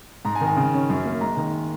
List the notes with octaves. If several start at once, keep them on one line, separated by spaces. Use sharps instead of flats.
G#2 A#5
G#5
D#3
G#5
C#3
C#4
F#2
A#3
G#3 A#5
D#3